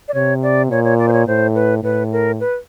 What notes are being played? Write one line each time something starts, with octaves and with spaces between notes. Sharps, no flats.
D5
C3 C#5
D5
A#2 C#5
C#5
D5
C5
C#5
A2 C5
B4
A2 B4
A#4
B4